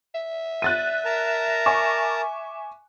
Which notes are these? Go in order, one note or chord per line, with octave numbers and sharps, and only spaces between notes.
E5
F#6 A6 D#7
A#4 A5 A#5
G#5 C#6 D6